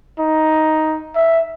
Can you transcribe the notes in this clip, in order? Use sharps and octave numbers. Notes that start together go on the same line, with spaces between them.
D#4
E5